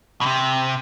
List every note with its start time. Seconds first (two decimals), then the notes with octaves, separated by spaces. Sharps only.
0.21 B2
0.26 C3